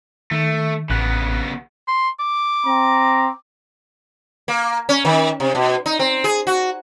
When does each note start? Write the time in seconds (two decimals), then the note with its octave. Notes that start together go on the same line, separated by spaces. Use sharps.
0.31 D#3 A3
0.90 A1 C#3 B3 F#6
1.88 C6
2.19 D6
2.66 C4 A#5
4.48 A#3
4.89 C#4
5.05 D#3
5.40 C3
5.55 B2
5.86 D#4
5.99 C4
6.24 G#4
6.47 F#4